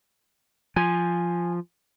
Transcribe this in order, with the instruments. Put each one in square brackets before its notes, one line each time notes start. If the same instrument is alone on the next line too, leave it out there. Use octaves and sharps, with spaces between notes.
[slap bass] F3 [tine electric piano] G#5